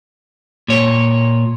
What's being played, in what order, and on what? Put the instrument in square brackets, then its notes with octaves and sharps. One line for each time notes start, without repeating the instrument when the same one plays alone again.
[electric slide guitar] A#2 C#5